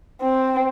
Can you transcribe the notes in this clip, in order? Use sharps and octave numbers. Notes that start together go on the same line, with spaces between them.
C4